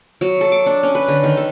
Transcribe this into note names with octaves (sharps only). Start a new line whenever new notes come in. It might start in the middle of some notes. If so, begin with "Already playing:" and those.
F#3
A4
D6
D4
C#4
B4
D3
D#3
A4